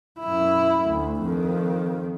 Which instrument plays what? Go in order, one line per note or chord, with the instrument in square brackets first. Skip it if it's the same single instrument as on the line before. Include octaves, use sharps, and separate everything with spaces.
[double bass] F#2 E4
D2
F2 D#3